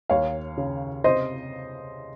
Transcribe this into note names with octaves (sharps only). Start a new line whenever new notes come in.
D#2 C#5 F5
C#3
C3 C5 D#5